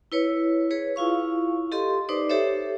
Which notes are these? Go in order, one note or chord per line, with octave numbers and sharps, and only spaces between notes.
E4 B4 C#5
G#4 B4 C#5
E4 F4 F5 C#6
G4 A4 D#5 C6
D#4 B4 C5 D5 D6
G4 A4 C5 C#5 E5